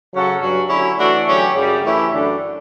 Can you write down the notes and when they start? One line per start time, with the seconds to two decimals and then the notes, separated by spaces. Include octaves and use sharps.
0.12 C#3 F#3 C#4 F#4 A4
0.41 G2 F#3 C#4
0.69 D3 F#3 C#4 E4
0.99 E3 A3 D4 F#4 A4
1.27 D3 F#3 C#4 G4
1.55 F#2 C#3 G3
1.83 E3 A3 C#4 E4 G4
2.12 F#2 D3 A3 D4